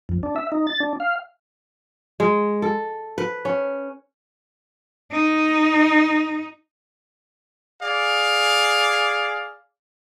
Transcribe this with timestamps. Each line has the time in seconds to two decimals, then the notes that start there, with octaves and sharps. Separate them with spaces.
0.09 F2
0.23 D4
0.36 E5
0.52 D#4
0.67 A6
0.80 D4
1.00 F5
2.20 G#3
2.62 A4
3.18 B4
3.45 C#4
5.11 D#4
7.81 G#4 D5 F5